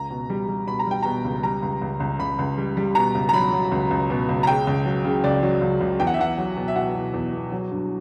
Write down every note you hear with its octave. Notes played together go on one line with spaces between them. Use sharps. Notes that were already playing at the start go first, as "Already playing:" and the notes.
Already playing: C#2 A#5
B2
G3
G3
B2 B5
A#5
G3 G5
B2 A#5
C#2
G3 A#5
C#2
C#2
C#2
C#2 B5
C#2
G3
G3
B2 A#5
C#2
A#5
F#3 B5
F#3
C#2
C#2
B2
C#2
A#5
C#3 G5
C#2
F#3
C#3
C#2 D5
F#3
C#2
C#2
E2 G5
F#5
E5
E2 F#5
F#3
B2
E5
B2 F#5
B2
E2
B2
F#3
G2